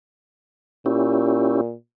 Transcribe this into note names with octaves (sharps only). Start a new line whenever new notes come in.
A#2 C#4 E4 G4